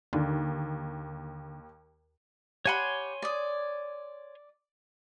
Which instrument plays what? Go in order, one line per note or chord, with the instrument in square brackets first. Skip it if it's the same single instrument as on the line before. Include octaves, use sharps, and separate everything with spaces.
[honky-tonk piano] D#2 [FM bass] D3
[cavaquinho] G4 F#5 B5 [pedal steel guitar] C#5 G#5 C6
[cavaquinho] D5 D#6